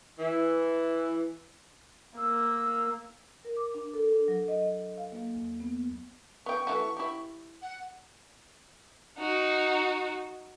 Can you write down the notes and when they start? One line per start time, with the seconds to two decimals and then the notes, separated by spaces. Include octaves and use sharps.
0.19 E3
2.17 A#3 E6
3.45 A#4
3.57 D6
3.74 D4
3.94 A4
4.13 D4
4.28 F#3
4.48 D#5
4.62 D#5
4.98 F5
5.12 A#3
5.35 E2
5.60 B3
6.46 B3 G5 C#6
6.67 E3 A3 F#4
6.97 E4 G4
7.62 F#5
9.19 D#4 F#4